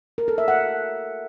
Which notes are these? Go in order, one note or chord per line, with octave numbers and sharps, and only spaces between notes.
A#4
A4
E5
F#5